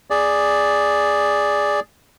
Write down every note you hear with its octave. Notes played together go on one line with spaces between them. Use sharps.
G#4 D5